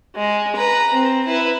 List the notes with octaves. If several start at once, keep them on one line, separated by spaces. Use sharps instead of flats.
G#3
B4 A#5
C4
E4 B4